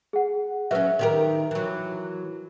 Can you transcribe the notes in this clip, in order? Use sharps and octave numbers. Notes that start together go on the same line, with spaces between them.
G#4 F#5
F#3 C#4 B4 E5
D#3 G4 A#4
E3 F#3